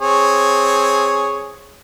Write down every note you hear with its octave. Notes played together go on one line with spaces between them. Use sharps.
C4 G#4 C#5